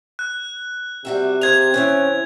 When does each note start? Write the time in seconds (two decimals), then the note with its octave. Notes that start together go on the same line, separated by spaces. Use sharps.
0.19 F#6
1.05 C3 G3 F#4 E5
1.41 G#4 C5 F5 G#6 F7
1.74 C3 E3 C4 C#4